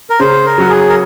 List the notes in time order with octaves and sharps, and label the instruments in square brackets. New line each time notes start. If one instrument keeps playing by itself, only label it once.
[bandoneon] A#4
[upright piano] C#3 [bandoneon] C5
[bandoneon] A#4
[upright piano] F#3 C#4 F#4
[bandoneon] G#4
A#4